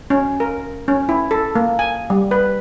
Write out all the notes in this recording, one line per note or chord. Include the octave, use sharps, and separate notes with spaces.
C#4
A#4
C#4
E4
A4
A#3
G#5
G3
B4